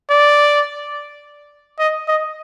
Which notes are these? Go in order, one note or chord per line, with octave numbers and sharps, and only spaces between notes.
D5
D#5
D#5